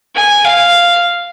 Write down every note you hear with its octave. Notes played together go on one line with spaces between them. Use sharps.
G#5
F5